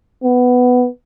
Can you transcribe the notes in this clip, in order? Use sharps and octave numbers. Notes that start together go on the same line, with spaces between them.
B3